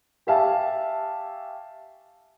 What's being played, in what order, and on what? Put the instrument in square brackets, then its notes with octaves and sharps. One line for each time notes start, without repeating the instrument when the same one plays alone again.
[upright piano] G4 C#5 E5 F5 G#5 A5